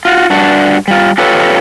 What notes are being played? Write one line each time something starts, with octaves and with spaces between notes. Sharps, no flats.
F4 F#4
G2 D4 F#4
G3 F4
F4 G4 A4 B4 C#5